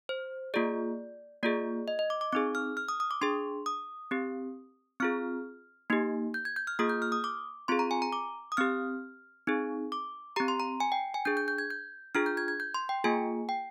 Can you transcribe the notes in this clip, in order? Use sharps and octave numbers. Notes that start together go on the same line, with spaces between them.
C5
A#3 F4 G#4 D5
A#3 F4 G#4 D5
D#5
D#5
D6
D6
C4 D#4 G#4 D6
F6
F6
D#6
D#6
D6
D4 G#4 C6
D#6
C4 G4
C4 F4 G#4 F6
A#3 D#4 G4
G6
G#6
G6
F6
A#3 F4 G#4 D#6
G6
F6
D#6
D6
C4 F4 G#4 C6
A#5
G#5
A#5
D6
D#6
C4 G4 F6
C4 D#4 G#4
D6
C4 G4 A#5
C6
A#5
G#5
G5
G#5
D4 G#4 G6
G6
G6
G#6
G6
D4 F4 G#4 F6
G6
G#6
G#6
G6
C6
G5
A#3 F4 G#4 G#5
G5